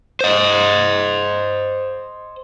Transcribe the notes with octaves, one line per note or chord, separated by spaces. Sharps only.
C5 D#5